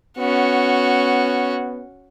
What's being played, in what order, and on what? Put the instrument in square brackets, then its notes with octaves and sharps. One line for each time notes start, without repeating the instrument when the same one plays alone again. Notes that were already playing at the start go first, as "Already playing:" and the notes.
[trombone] B3 [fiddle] C#4 F#4